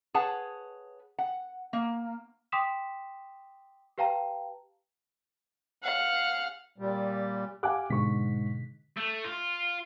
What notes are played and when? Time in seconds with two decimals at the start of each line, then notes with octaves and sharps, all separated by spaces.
0.14 G#4 B4 C#5 F#5 A5
1.18 F#5
1.73 A#3
2.52 G5 C6 D6 D#6 B6 E7
3.98 G4 B4 F5 G5 A5 A#5
5.83 F5 F#5
6.78 A#2 G3
7.63 G4 F5 F#5 G#5 D6 F#6
7.90 G#2 B2 D3 C#6 B6
8.97 A3
9.25 F4